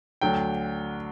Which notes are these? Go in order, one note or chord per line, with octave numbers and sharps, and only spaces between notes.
D2 D3 F#3 G5